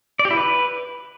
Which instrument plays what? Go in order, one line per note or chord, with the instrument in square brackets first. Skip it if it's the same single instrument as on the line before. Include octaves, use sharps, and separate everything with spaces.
[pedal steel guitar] D5
G4
E4
B4